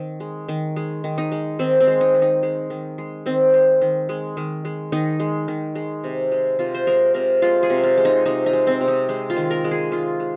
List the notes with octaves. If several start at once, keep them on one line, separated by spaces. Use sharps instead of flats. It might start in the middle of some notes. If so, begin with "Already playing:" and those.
Already playing: D#3 C4
G#3
D#3
G#3
D#3
D#4
G#3
D#3 C4
C4
G#3
D#4
D#3
D#4
G#3
D#3
G#3
D#3 C4
G#3
D#3
G#3
D#3
G#3
D#3 D#4
G#3
D#3
G#3
C3
G#3
C3 F4
C5
G#3 A#4
C3 A#4
G#3 F4
G#4
C3
F4
G#3
D#4
C3 D#4
D#4
G#3
C4
C3
D#4
G#3
F4
D#3
A#4
G#3
G#4
D#3 F4
G#3